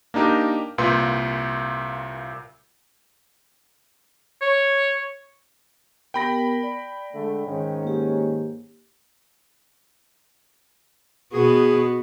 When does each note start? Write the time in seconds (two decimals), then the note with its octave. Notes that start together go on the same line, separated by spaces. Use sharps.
0.14 A#3 D4 D#4 G4 A#4
0.78 C2 A#2 F4 B4 C6 G6
4.42 C#5
6.14 B3 G4 A#4 G5 B5 A#6
6.63 D5
7.13 D3 G#3 A3
7.46 G#2 D#3 C#4
7.83 A#3 G4
11.33 B2 B3 F#4 G#4